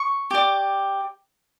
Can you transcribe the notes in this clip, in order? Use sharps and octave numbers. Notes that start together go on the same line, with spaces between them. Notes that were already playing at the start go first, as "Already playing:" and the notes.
Already playing: C#6
G4 D5